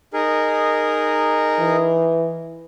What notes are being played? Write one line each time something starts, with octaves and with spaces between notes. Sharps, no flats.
D#4 G#4 A#4
E3